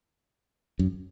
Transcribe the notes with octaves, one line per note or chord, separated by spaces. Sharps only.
F#2